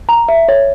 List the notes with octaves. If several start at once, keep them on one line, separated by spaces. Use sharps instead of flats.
A#5
E5
C#5